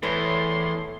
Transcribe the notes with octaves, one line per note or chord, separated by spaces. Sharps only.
E2 A2 A4 B4 C#5 C6